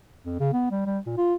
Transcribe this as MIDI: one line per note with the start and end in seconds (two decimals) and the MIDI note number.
0.25 0.37 41
0.40 0.50 49
0.53 0.71 59
0.71 0.84 55
0.86 0.99 55
1.06 1.14 46
1.17 1.35 65